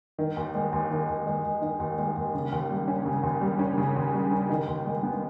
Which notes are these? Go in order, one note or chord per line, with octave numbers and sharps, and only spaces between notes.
D#3
D#2
G#3
D#2
D#3
D#2
G#3
D#2
D#3
D#2
G#3
D#2
C#3
D#2
G3
C#4
C#3
D#2
G3
C#4
C#3
D#2
G3
C#4
D#3
D#2
G#3
B3